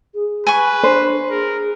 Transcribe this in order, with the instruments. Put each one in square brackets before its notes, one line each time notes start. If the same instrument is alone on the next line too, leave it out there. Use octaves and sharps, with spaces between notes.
[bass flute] G#4
[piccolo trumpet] B4 [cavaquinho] G#5 B5 C#6
[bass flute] D4 [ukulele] C5
[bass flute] G#4 [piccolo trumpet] A#4